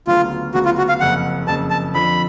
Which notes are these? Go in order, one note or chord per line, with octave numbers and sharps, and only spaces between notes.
D2 C#3 F#3 B3 F4
D2 C#3 F#3 B3 F#4
F4
F#4
F5
F#1 F2 C#3 F#5
F#1 F2 C#3 A5
A5
F2 D3 F3 B5